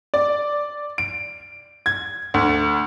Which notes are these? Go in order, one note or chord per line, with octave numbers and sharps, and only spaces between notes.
D5
D7
G#6
D2